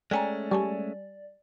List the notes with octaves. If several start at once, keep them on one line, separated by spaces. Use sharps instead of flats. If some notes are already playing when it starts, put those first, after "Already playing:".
G#3 A3 C#4 D5 G5 G#5 A#5
G3 G#5 A5 C#6